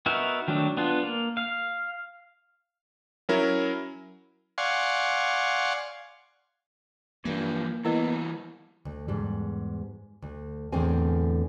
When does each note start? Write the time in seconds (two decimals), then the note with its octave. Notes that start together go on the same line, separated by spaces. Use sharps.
0.06 B3 D#4 F#4 A#4 E5
0.48 D#3 F#3 A3 D4
0.77 B3 D4 F4
1.03 A#3
1.37 F5
3.29 F#3 C#4 E4 A#4
4.58 D5 F5 F#5 G#5 C6 C#6
7.25 G2 E3 F3 A#3
7.85 E3 G3 B3 E4 A#4 D#5
8.85 D2
9.08 E2 G#2 G3
10.22 D2
10.72 E2 A2 D3 A3 C4 G#5